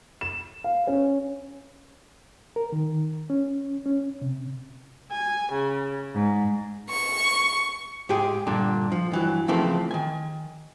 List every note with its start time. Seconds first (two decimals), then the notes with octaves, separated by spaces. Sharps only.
0.21 E7
0.64 F5
0.87 C#4
2.56 A#4
2.72 D#3
3.30 C#4
3.86 C#4
4.22 C3
5.09 G#5
5.51 C#3
6.14 G#2
6.89 C#6
8.09 G#2 G4 G#4
8.47 G2 A#2 D3 D4
8.92 F3
9.12 G2 E3 F#3
9.48 C#3 E3 F3 A3 A#3 C4
9.91 D#3 G#5